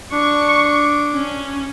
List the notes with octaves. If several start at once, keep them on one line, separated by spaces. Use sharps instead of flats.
D4 C#6
C#4